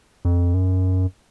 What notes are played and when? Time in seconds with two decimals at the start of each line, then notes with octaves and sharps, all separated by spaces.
0.25 F2
0.54 F#2